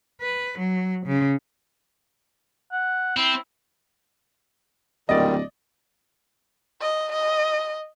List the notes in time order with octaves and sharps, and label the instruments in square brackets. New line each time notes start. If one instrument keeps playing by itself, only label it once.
[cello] B4
F#3
C#3
[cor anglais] F#5
[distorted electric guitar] C4 [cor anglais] E4
[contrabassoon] D1 [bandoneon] A#2 D#3 G3 [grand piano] D5 D#5
[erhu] D#5
D#5